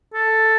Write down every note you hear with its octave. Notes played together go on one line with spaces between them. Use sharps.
A4